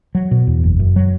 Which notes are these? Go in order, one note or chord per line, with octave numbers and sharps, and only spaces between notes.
F#3
B2
E2
F#1
F#2
F#3